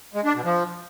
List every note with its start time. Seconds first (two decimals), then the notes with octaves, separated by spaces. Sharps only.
0.14 G#3
0.24 D4
0.34 B2
0.44 F3